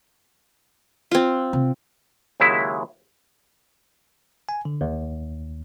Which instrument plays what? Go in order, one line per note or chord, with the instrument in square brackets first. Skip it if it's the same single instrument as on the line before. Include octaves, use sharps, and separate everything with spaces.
[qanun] C4 F4
[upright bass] C3
[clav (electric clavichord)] D#2 C#3 F#3 G#3 E4 E5
[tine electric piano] G#5
D3
D#2